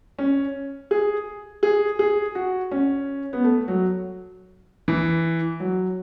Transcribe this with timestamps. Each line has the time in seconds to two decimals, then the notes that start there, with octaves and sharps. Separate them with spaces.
0.19 C#4
0.91 G#4
1.63 G#4
1.99 G#4
2.35 F#4
2.71 C#4
3.33 B3
3.44 A3
3.68 F#3
4.88 E3
5.60 F#3